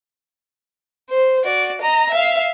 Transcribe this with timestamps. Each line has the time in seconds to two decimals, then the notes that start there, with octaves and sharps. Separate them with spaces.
1.10 C5
1.44 F#4 D5
1.81 D#5 A#5
2.10 E5 F5